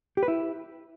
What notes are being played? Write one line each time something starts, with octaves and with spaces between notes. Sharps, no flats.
G4
B4
E4